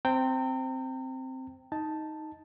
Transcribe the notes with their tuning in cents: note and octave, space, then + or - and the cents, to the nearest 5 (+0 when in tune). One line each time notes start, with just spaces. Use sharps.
C4 +0 G5 +0 A#5 -40
D#4 +5 A5 +0